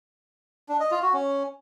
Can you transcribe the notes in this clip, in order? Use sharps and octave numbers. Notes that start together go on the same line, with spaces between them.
D4
D#5
F4
F#4
C#4